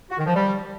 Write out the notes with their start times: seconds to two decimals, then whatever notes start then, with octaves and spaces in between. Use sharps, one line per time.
0.10 F#4
0.18 D#3
0.26 F3
0.34 G3